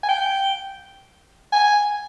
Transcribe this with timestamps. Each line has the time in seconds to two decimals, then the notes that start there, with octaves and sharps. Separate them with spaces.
0.03 G#5
0.09 G5
1.52 G#5